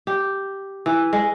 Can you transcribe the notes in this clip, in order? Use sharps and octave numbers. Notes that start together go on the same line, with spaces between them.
G4
E3
G#3